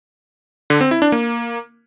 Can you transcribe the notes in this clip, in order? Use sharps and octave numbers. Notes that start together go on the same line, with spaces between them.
D3
C4
E4
D4
A#3